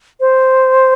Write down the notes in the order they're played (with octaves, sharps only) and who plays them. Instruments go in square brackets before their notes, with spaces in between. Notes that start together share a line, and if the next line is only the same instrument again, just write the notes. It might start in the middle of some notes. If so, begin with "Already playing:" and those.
[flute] C5